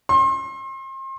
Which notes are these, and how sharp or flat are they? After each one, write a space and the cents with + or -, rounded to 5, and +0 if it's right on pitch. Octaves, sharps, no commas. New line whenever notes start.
C6 +35